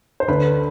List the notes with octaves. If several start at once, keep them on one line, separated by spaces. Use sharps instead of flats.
C5
D2 D3 B4